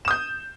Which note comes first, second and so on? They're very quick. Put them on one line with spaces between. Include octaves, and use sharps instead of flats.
E7 D#6 G6